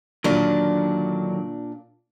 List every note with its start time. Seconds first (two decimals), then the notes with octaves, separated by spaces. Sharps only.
0.24 A#2 D3 D#3 F#3 D4